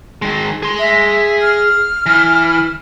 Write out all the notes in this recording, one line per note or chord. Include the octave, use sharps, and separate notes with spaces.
D#3 G#3
G#4 C6
E5
F6
E3